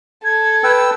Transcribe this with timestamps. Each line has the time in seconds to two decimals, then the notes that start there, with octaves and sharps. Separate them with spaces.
0.24 A4 G#6
0.64 B4 G5 E6